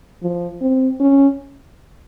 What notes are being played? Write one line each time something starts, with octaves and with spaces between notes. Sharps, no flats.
F3
C4
C#4